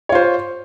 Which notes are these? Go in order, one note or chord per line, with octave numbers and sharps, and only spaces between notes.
F4 C5 C#5